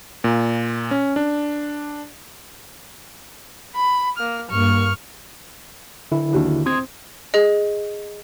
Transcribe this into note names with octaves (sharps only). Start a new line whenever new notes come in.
A#2
C#4
D4
B5
A#3 F6
G2 A#3 C#6 F6
D3 E4
D#2 F#3 D4
C4 C6 D#6 G#6
G#4 D#5